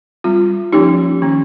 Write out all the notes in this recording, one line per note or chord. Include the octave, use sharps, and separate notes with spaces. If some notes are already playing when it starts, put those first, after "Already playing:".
G3 C4 F4
F3 A#3 C#4 D#4 G4
D#3 A#3 C#4